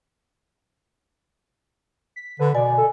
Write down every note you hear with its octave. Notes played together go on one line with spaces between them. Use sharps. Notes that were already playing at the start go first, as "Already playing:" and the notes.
B6
D3 B4
B2 D5 G#5
A4